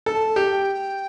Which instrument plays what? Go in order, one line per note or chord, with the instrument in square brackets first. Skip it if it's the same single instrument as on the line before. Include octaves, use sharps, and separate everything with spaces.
[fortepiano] A4 [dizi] A5
[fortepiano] G4
[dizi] G5